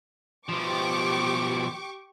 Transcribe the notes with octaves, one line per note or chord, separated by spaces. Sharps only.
B2 F3 G4 C#6 D6